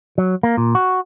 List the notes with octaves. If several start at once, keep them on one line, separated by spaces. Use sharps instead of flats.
F#3
A#3
A#2
F#4